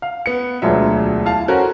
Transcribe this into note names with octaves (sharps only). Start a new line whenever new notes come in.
F5
B3 C#7
E1 D2 F#3 F4 E5
E4 F5 A5
C#4 F#4 A4 A#4 C5 C#5